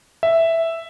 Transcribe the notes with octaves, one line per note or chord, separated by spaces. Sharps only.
E5